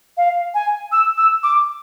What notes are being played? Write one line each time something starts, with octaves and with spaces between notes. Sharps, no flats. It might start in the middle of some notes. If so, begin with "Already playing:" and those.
F5
G#5
E6
E6
D6